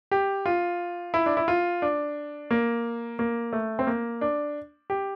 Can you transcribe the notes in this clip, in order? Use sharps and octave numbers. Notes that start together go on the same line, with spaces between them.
G4
F4
E4
D4
E4
F4
D4
A#3
A#3
A3
C4
A#3
D4
G4